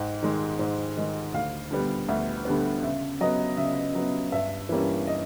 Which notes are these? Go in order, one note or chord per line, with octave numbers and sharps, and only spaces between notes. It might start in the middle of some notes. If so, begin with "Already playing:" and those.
Already playing: G#2 G5
D#3 G#3
G#2
D#3 G#3
D2 F5
D3 G3 B3
D2 E5
D3 G3 B3
C#3 E5
F#3 B3 D#5
C#3 E5
F#3 B3
G2 E5
E3 G3 A#3 C#4
D#5